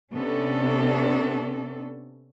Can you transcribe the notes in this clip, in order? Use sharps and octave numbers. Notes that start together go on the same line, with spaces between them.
C3 B3 C#4 D4 A4